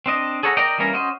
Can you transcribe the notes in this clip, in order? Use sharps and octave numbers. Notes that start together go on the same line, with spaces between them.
C4 D4 D#5
G#4 A4 C#5 F#5 A#5
A#4 D5 D#5 G5 A#5
E3 G3 A#3 C#4 A#4
C#4 F#4 C5 D#5